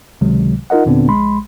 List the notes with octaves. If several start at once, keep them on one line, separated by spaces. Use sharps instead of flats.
C#2 C3 D#3 F#3 G#3
D#4 F4 A#4 D#5 F#5
D#2 A#2 D3 B3 C4 D4
A#1 G#3 B5 C6